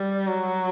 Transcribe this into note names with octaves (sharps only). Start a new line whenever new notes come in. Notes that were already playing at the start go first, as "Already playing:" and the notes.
Already playing: G3
F#3